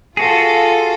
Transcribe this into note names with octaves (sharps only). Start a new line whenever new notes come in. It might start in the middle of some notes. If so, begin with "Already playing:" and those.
F4 F#4 G#4 A4